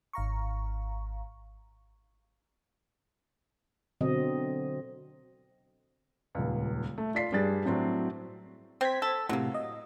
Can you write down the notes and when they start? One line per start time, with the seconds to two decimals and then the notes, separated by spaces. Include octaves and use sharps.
0.13 G#1 F5 A#5 C#6
4.01 B2 D3 F#3 C4 D#5
6.35 D#1 C#2
6.98 A3
7.15 F4 D5 B6 C7
7.32 G2 G3 D4 G#4 A6
7.65 A2 F#3 C4 D4
8.81 C4 C5 G#6 B6
9.02 A4
9.29 A2 C3 F#3 A#3
9.54 D#5